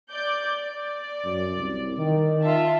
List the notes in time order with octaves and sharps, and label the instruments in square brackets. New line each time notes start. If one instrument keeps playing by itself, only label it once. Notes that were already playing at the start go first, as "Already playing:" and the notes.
[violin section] D5 D6 G6
D5
[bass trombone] F#2
C2
D#3
[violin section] F4 E5 A5